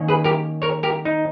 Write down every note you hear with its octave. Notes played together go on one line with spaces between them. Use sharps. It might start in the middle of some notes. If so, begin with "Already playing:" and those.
Already playing: D#3 A#3 C#4
G#4 B4
G4 A#4
A#4 C#5
G4 A#4
D#4